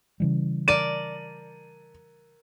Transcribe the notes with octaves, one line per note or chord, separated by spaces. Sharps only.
C#3 E3 G3
A#4 D5 A5 D#7